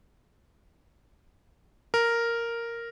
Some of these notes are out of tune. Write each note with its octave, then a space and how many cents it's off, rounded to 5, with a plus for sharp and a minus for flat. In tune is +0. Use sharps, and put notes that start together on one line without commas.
A#4 -5